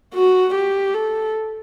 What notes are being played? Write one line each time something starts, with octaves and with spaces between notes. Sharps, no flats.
F#4
G4
A4